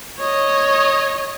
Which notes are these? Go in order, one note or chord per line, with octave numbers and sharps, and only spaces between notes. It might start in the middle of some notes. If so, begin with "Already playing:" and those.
C#5 D#5